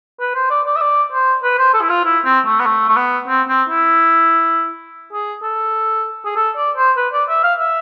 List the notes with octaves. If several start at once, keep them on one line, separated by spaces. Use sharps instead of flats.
B4
C5
D5
D5
E5
D5
C5
B4
C5
A4
E4
F4
E4
C4
A3
B3
A3
A3
B3
C4
C4
E4
G#4
A4
G#4
A4
D5
C5
B4
D5
E5
F5
E5